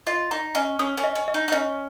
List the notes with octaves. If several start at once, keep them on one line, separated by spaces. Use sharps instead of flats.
F4 D#5
D#4 A#5
C#4 D#5
C#4 D#6
C#4
D#5
C#4
D#5
D#4
D#4
C#4 D#5